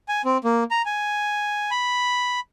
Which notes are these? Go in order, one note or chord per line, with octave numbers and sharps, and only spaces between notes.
G#5
C4
A#3
A#5
G#5
B5